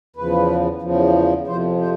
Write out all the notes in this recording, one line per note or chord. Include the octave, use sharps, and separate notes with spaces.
E2 C#3 F3 B4
E2 C#3 F3
F2 C3 F3 C5
C5